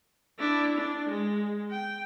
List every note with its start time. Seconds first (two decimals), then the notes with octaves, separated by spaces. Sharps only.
0.39 D4 E4
0.77 D4
1.09 G#3
1.71 G5